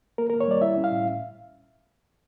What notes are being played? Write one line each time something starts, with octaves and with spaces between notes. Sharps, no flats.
A#3 A#4
A#3 A#4
C#5
G3 D5
E4 E5
C#4
F5
A2